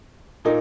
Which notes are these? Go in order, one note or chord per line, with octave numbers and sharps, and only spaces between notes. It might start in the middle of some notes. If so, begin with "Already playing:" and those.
A#2 A#3 D#4